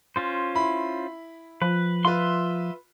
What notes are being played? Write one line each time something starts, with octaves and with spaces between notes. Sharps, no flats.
C#4 F4 C5
E4 B5
F3 B4
F4 B4 E5 C6